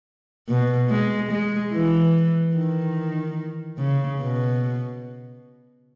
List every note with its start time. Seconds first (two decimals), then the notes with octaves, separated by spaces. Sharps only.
0.49 B2
0.90 G#3
1.31 G#3
1.73 E3
2.55 D#3
3.78 C#3
4.20 B2